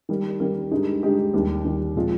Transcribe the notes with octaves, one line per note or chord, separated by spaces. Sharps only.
D#3 G3 A#3
D#3 G3 A#3
G2 D3 G#3 D#4 G4
G2 D3 G#3 D#4 G4
D#2 D#3 G3
D#2 D#3 G3
A#2 F3 G#3 C4 F4